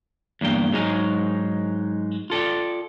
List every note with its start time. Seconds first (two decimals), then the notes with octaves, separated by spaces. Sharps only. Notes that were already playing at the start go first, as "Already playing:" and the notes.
0.41 E2 G2 A#3 G5
0.72 G#2 F#3 G#3 D#4 A#4 G#5
2.30 F4 A4 D5 G5